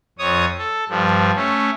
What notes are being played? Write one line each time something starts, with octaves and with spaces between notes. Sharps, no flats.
F2 C#5 D#6
A4
G2 F3
A3 C#4